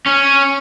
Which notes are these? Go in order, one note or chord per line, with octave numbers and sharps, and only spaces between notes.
C#4